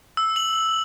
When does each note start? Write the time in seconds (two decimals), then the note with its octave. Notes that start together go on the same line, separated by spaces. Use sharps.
0.17 E6
0.36 F#7